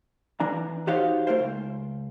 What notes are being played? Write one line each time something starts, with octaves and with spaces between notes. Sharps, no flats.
E3 D4 A#5
D#4 F#4 G4 C5 C#5 F5
A3 F4 A#4 C5
C#2